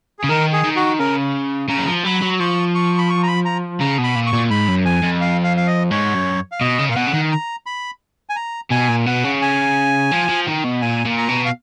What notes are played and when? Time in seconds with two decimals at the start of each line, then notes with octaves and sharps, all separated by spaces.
0.19 C#3 G#4
0.29 D#3 A#4
0.53 G#4
0.64 D#3
0.76 F#4
0.99 C#3 A#4
1.69 C#3 A#5
1.79 F#3
1.87 F3
2.05 F#3 B5
2.22 F#3
2.40 F3 C#6
2.75 C#6
2.98 B5
3.10 C#6
3.23 A#5
3.28 B5
3.45 A#5
3.80 C#3 A#5
3.98 B2
4.04 B5
4.15 A#2
4.26 C#6
4.33 A#2
4.50 G#2 B5
4.68 F#2
4.86 F2 G#5
5.03 F2
5.21 F5
5.44 F5
5.57 F5
5.67 D#5
5.91 G#2 C#5
6.14 F#2
6.52 F5
6.60 B2 D#5
6.79 C#3
6.89 A#2 F5
6.96 B2 F#5
7.07 C#3
7.13 D#3
7.31 A#5
7.66 B5
8.29 G#5
8.36 A#5
8.71 B2 G#5
8.89 A#2
9.06 B2 F#5
9.24 C#3
9.42 G#5
10.12 F3
10.29 F3
10.47 D#3
10.64 B2
10.82 A#2 G#5
11.05 A#2
11.17 A#5
11.28 B2
11.45 F5